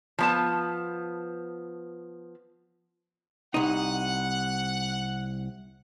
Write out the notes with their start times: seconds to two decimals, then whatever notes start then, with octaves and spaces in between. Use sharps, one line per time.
0.19 F3 B3 A5
3.54 C2 D#4 F#5